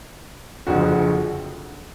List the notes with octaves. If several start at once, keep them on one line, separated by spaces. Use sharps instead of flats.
F#1 F2 D3 F3 F#4